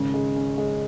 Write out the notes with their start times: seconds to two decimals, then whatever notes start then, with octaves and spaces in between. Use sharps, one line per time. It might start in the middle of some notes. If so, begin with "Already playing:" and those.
Already playing: G#1 C#3
0.14 G#3
0.36 C#4
0.58 G#3